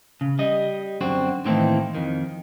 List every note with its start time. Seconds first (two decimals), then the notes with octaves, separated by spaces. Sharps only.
0.21 C#3
0.39 G3 D#5
1.01 F#2 D3 C4 F#4
1.45 A2 D#3 E3 A#3 C4
1.95 F2 D#3